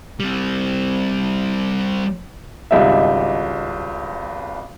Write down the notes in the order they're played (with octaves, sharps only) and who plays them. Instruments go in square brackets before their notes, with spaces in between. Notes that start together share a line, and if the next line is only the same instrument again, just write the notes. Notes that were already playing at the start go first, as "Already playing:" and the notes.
[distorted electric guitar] G3 C4
[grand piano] G#1 C#2 G3 D#4 D#5 E5